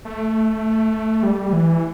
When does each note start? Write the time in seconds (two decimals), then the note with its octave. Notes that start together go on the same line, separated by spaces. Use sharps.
0.05 A3
1.23 G3
1.53 E3